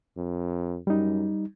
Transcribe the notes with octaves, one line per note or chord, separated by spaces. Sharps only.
F2
F#2 G3 D#4